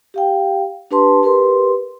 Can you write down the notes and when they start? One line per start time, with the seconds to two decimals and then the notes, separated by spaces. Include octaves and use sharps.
0.14 G4 F5 G5
0.91 D4 G4 B4 A5 C6
1.23 G4 A#4 B4 C6